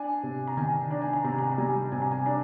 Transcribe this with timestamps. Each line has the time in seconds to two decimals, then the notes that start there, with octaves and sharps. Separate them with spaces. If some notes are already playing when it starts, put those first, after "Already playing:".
Already playing: D4 G#5
0.23 C3
0.47 A#5
0.57 D#3 G#5
0.91 D4 A#5
1.02 G#5
1.13 A#5
1.24 C3 A#5
1.32 G#5
1.38 A#5
1.50 A#5
1.58 G3 G#5
1.92 C3 G#5
2.02 A#5
2.12 G#5
2.26 D4 A#5